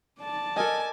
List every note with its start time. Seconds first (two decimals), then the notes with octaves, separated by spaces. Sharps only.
0.20 D5 A5
0.57 A4 A#4 D#5 G#5